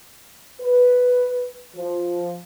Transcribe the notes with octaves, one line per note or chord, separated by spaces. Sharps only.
B4
F3